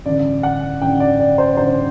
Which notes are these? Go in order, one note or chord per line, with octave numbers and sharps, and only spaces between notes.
A1 G2 D3 D5
F#5
A1 G2 D3 G5
D5
D5
C5
A1 G2 D3 C5